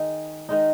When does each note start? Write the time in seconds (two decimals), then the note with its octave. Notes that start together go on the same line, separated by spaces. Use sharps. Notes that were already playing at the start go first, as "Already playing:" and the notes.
Already playing: D#3 G#3 D#4
0.49 D#3 G#3 D#4